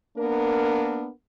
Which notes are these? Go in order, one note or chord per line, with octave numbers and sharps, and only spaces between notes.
A#3 B3 D4 A#4